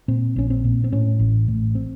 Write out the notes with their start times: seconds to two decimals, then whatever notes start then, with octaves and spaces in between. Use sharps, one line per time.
0.08 A#2 C4
0.36 A#1 C#4
0.50 C4
0.64 A#2
0.84 C4
0.92 A2 C#4
1.19 A1
1.48 A2
1.75 C4